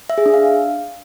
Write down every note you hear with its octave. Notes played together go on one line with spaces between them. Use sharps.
E5
G#4
D4
F5